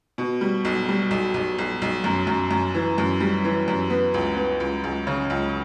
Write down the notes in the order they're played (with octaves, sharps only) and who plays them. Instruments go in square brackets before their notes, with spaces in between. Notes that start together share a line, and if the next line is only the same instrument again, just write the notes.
[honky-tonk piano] B2
G3
B1
G3
B1
B1
B1
B1
F#2
F#2
F#2
E3
F#2
G3
E3
F#2
B3
C#2
B3
C#2
C#2
C#3
C#2